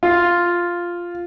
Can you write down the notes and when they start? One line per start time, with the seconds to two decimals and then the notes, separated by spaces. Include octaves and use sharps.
0.03 F4